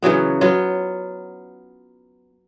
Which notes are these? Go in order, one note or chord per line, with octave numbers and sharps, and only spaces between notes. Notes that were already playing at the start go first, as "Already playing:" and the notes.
C#3 E3 F#3 B3
F#3 B3 F4